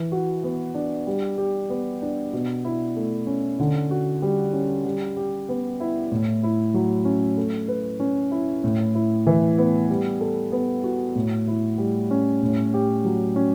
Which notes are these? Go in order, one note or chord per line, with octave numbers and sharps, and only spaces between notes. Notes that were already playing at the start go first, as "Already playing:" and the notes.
Already playing: E3
F#4
B3
D4
G3
G4
B3
D4
B2
E4
A3
C#4
D3
F#4
G3
C#4
G3
G4
B3
E4
A2
E4
F#3
C#4
A3
B4
C#4
E4
A2
E4
E3
B3
G3
A4
B3
F#4
A2
E4
G3
C#4
A2
G4
F#3
C#4